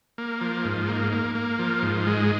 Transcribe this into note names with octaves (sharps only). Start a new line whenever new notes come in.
A#3
F3
G#2
A#3
A#3
A#3
F3
G#2
G#3